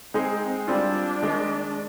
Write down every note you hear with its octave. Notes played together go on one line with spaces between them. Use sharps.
G#3 C4 D#4 G#4 C5
G3 C4 D4 F4
D#3 G#3